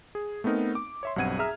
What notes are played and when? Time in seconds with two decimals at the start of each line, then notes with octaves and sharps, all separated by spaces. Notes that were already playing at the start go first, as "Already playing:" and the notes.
0.15 G#4
0.44 A3 B3 C4 D#4 A#4
0.75 D6
1.03 C#5 E5 C6
1.16 B1 G2 C4 F#5 G#6 D#7
1.39 G#4 E5 A#5 F6